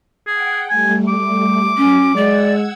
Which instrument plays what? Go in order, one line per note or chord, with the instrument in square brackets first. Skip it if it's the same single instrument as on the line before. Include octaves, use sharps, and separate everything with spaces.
[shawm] G#4 [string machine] F#5 G5
[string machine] G3 A3 [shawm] G#5
[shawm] D6
[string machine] F#3 [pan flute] C#4
[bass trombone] G#3 [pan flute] D5 [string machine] F#5 E6 G#6